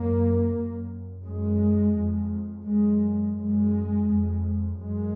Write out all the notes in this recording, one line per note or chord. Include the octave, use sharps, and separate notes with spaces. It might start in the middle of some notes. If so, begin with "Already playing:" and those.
Already playing: F#2 A#3
F#2
F#2 G#3
F2
F#2 G#3
F#2 G#3
F2
F#2 G#3